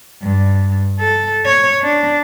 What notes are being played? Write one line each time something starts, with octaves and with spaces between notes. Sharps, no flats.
G2
A4
C#5
D4